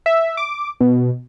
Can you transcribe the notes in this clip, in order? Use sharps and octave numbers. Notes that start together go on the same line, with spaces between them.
E5
D6
B2